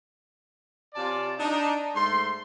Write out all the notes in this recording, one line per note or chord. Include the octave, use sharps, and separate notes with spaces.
C3 C#4 F4 D5 A5
D4 D#4
G#2 A3 C6